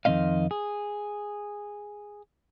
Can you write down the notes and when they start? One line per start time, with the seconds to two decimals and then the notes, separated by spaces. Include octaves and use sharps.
0.05 F2 D#3 F3 C4 D#5 F5
0.51 G#4